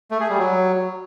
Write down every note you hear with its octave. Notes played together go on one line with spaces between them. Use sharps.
A3
G#4
G3
F#3